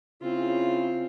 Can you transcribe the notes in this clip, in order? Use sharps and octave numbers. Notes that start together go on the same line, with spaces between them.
C#3 C4 E4 F4